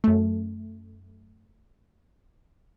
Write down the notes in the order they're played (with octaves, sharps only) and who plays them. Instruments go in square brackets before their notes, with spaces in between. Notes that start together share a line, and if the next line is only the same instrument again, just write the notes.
[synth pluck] F#2 A3